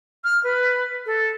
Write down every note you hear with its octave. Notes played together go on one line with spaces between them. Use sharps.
F6
B4
A4